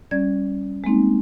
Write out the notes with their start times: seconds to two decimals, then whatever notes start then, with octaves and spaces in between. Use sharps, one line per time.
0.11 G3 C#4 D5 G#6
0.84 G#3 A#3 C4 D#4